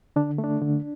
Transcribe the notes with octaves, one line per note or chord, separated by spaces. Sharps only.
D3 D4
A3
D4
D3